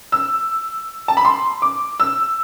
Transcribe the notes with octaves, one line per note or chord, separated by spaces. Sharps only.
E6
A5
B5
C6
D6
E6